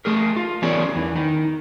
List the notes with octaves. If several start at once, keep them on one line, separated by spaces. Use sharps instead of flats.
A3 G#4 A#4
F4
E3 B3 C#4 G#4 A#4 D5
E2 E3
D#3